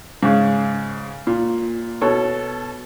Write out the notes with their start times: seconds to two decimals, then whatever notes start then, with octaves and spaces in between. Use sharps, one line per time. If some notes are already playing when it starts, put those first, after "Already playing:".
0.23 G#2 C#3
1.27 A#2
2.01 B2 A4 C#5